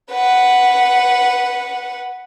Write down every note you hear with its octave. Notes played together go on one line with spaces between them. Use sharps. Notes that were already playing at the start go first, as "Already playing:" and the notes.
B4 F#5